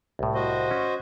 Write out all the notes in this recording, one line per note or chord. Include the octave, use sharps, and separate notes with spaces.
C2 A2
F#4 C5 D#5
C#4